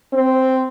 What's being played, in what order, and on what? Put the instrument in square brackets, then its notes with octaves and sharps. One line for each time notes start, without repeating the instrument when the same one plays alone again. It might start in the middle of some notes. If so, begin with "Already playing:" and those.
[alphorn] C4